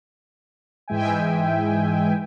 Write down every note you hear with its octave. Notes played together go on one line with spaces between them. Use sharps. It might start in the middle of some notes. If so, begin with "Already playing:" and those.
G#2 E3 G#3 E5 G5 G#5